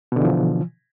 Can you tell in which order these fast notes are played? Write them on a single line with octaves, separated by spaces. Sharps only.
B2 D3 E3 F3